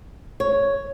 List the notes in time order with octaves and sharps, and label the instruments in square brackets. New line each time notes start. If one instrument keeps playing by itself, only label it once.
[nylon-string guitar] C#5